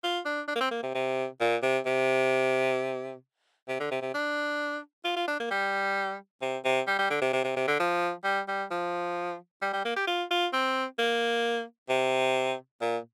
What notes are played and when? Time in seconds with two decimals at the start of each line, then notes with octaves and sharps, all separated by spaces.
0.03 F4
0.25 D4
0.48 D4
0.56 A#3
0.60 C4
0.71 A#3
0.83 C3
0.94 C3
1.40 A#2
1.62 C3
1.86 C3
3.68 C3
3.80 D3
3.91 C3
4.02 C3
4.14 D4
5.04 F4
5.16 F4
5.28 D4
5.40 A#3
5.51 G3
6.42 C3
6.65 C3
6.87 G3
6.99 G3
7.10 D3
7.21 C3
7.33 C3
7.44 C3
7.56 C3
7.67 D3
7.79 F3
8.24 G3
8.48 G3
8.71 F3
9.62 G3
9.73 G3
9.85 A#3
9.96 G4
10.07 F4
10.31 F4
10.53 C4
10.98 A#3
11.89 C3
12.81 A#2